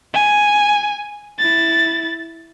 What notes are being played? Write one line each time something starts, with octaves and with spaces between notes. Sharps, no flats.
G#5
E4 A6